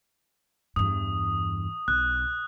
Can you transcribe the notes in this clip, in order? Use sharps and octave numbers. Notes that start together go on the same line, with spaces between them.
E2 G2 D#6
B1 F#6